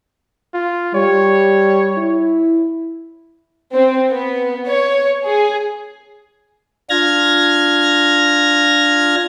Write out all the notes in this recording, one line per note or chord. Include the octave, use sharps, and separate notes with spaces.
F4
G3 C#5
E4
C4
B3
C#5
G#4
D4 F4 F6 G#6 A#6